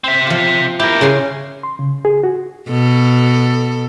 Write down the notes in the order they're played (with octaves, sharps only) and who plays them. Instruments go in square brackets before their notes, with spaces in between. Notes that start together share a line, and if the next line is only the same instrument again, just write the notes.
[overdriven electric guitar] C4 E5
[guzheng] F3 F4
[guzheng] E4 [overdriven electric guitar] G4 A#4
[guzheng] C#3 G#5 C6
[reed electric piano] C6
C#3
G#4
F#4
[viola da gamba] B2 A4